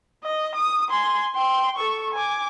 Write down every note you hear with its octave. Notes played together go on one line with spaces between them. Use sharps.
D#5
D#6
G#5 C6
G5 C6
A4 C#6
G#5 D6